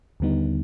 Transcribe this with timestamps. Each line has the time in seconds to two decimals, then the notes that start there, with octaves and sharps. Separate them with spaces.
0.20 D#2 D3 G3 B3 D#4